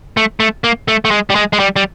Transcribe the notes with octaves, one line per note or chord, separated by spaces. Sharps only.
A3
A3
A#3
A3
A3
G#3
G3
G#3
G#3
G3
G3